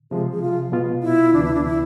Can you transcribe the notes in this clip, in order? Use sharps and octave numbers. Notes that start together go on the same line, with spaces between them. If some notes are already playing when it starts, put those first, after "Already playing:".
C3 F3 G#3 G#4
G#4
F4
B2 B3 F4
E4
D2 C3 E3 B3 D4
E4
D4
E4